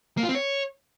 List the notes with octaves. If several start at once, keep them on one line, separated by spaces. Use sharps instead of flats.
A#3
F4
C4
C#5